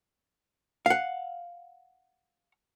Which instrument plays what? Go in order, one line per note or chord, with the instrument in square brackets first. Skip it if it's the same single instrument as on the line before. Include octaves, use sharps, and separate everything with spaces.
[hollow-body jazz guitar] F5 F#5